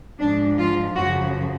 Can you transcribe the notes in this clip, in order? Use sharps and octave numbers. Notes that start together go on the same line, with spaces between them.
G#2 F3 D4
F4
F#2 C#3 F3 F#4